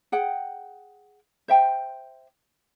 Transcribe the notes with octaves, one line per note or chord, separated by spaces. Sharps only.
G#4 F#5 G5
C5 E5 G5